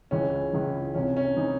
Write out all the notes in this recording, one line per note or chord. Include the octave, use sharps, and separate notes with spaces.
C#2 C#3 E3 C#4
C#2 C#3 E3
C2 C3 E3 C#4
C#4
C3 E3 D#4